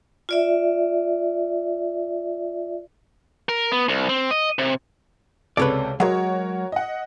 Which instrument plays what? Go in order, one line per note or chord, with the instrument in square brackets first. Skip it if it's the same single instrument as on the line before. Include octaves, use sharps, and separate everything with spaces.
[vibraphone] F4 D5 E5
[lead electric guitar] A#4
B3
C2
C4
D#5
C3
[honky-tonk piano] C#2 C3 A4 [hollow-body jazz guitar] B4 C#5 D5
[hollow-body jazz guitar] F#3 G#3 [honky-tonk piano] F#4 A#4 C#5
[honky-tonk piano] D#5 F#5